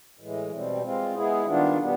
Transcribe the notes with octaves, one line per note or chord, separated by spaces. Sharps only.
A2 E3 G#3
B2 G3 C4
G#3 C4 F4
G#3 B3 E4 G#4
D#3 G3 B3 D4 F4
B2 G3 B3